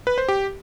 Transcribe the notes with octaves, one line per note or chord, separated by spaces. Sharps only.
B4
C5
G4